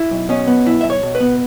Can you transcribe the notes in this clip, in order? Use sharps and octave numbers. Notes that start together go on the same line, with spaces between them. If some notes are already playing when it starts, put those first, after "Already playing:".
Already playing: E4
B1
B2 C#4
B3
B1 E4
B1 E5
C#5
B2
B4
B3